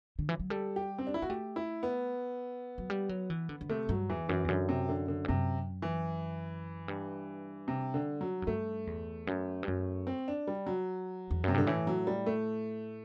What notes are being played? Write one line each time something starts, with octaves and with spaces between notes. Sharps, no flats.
D3
E3
F#3
G3 A4
G4
C4
D4
E4
B3 F#4
A3 G4
E4
B3
F#3
G3
F#3
E3
D3
D3
C3 A3
G2 F#3
E2 E3
F#2 E3
E2
F#2 D3
C3
D3
D3
G2
F#2 C3
E3
G2
C3
D3
F#3
F#2
G2 A3
E2
F#2
G2
F#2
C4
D4
G3
F#3
E2
F#2 C3
G2 D3
A2 E3
F#3
G3
A3